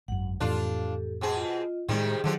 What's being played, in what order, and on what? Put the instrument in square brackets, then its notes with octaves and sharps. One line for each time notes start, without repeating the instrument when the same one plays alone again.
[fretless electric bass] G#1 F#2 [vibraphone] F#5
[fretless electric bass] F2 A2 E3 [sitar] D4 F4 [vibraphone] G4 A4
[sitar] B2 C4 G#4
[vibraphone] F4 D#5
[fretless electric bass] A2 G#3 [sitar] C3 D#3 G3 [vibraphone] G#4
[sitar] D3 F3 G4 [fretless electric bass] D#3 F#3